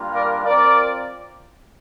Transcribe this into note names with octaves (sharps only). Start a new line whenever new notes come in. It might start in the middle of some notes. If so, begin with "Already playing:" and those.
Already playing: G3 A#3 D4 F4
A#4 D5
C4 F4 A#4 D5